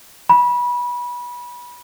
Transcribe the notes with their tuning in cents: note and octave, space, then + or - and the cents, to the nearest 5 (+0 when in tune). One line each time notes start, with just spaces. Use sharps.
B5 -25